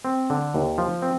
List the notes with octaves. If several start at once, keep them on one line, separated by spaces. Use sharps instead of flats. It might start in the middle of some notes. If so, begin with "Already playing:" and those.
C4
D3
D#2
F3
C4